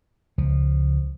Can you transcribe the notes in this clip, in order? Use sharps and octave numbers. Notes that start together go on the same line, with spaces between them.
C#2 F3